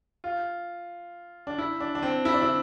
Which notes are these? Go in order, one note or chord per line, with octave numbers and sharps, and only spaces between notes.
F4
D4
E4
D4
D4
C4
E4
D4
E4